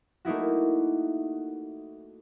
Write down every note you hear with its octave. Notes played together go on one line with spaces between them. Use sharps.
A3 A#3 D#4 E4 F#4